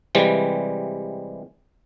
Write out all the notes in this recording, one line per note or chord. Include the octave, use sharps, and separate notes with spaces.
C3 E3 G3 G#3